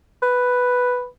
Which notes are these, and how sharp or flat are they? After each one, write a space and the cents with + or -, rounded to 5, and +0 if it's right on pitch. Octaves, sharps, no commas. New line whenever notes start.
B4 +0